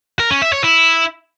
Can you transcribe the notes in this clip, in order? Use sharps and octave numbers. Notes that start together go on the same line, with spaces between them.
A#4
C#4
E5
C#5
E4